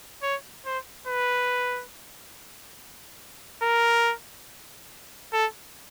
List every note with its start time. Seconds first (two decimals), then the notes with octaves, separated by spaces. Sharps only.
0.23 C#5
0.66 C5
1.07 B4
3.63 A#4
5.33 A4